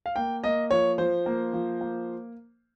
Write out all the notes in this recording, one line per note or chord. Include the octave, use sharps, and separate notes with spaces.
F5
A#3 G5
A#3 D#5
F3 C#5
F3 C5
A#3
F3
A#3